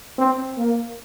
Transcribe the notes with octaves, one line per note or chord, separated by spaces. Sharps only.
C4
A#3